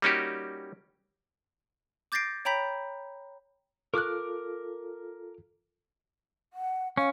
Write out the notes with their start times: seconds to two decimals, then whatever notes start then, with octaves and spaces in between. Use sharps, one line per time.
0.02 G3 A#3 C#4 D#4 F#4 G4
2.12 D6 G6 A6 A#6 C7 D7
2.45 C#5 G5 A#5 B5 G6 B6
3.94 F4 A4 A#4 C#6 D6 F6 F#6
6.53 F#5
6.97 C#4 F5